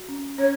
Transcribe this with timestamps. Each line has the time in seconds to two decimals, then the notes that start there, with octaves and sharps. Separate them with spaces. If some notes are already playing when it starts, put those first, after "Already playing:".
Already playing: F#4
0.09 C#4
0.38 C#4 C#5